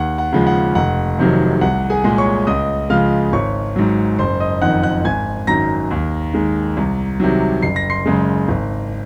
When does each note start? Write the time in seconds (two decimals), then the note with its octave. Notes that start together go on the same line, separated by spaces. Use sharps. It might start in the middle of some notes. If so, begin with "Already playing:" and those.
Already playing: D#2 F#5
0.18 F#5
0.33 C#3 F3 G#3
0.47 F#5
0.75 F1 F#5
1.19 F2 C3 D#3 F#3
1.61 C2 F#5
1.90 G#4 G#5
2.04 A#2 G#3
2.18 C#5 C#6
2.47 C#2 D#5 D#6
2.90 C#3 F3 G#3 F5 F6
3.33 G#1 C#5 C#6
3.76 G#2 F#3
4.19 F#1 C5 C6
4.40 D#5 D#6
4.62 F2 D#3 F#5 F#6
4.83 F#5 F#6
5.05 G#1 G#5 G#6
5.47 F#2 D#3 F#3 A#5 A#6
5.91 D#2
6.34 D#3 G#3
6.77 C2
7.20 C3 D#3 F#3
7.63 F#1 C7
7.76 A#6
7.90 C6 C7
8.06 F#2 C#3 G#3
8.48 G#1